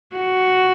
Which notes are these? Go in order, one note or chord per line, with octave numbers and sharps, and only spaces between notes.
F#4